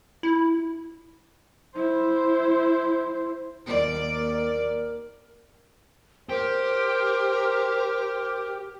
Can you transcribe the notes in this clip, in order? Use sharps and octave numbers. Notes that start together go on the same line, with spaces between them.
E4
E4 C5
D#2 A#4 D5
G4 A#4 C5